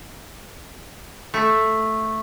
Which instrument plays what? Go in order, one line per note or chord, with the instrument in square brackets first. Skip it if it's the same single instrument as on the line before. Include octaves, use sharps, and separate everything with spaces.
[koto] A3